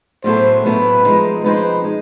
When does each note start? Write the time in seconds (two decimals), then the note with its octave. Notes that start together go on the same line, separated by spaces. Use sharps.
0.24 A2 F#3 B3 E4 A4 C5
0.64 A2 F#3 B3 E4 A4 B4
1.05 F3 G#3 C4 D#4
1.44 F3 G#3 C4 D#4 B4
1.84 G#3